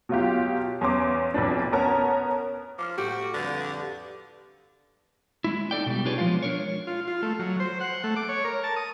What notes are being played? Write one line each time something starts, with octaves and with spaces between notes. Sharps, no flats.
B2 F#3 F4 G4
E2 C#4 C6 D6
B1 F2 D4
B3 C#4 A#4 A5 A#5
F3 D6 F6
A2 F#4 G4 D6
F2 D3 G3 B4
G#3 E4
D#4 A4 D5 G5
B2 G3
D4 F4 G4 G#4 B4 C#5
F3 G#3 B3 F4 F5
D4 A#4 C#5
F4
F4
A3
F#3
C5
F#5
A3
D6
C#5
A#4
A5
D#6